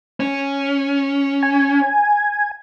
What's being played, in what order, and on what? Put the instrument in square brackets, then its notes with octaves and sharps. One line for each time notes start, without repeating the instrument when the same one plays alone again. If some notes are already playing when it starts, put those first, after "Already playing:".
[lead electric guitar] C#4
[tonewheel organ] G#5